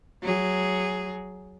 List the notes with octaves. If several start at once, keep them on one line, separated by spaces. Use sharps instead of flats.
F#3 G#4